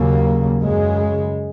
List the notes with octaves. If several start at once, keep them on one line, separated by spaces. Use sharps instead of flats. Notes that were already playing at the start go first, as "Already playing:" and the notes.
Already playing: D#2 C#3 F#3 A#3
F#2 C#3 G#3